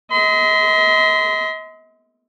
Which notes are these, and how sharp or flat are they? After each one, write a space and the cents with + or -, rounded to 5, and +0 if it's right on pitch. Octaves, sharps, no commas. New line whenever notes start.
D#5 +40 C6 -30